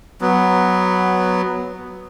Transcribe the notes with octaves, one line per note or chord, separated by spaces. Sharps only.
F#3 B3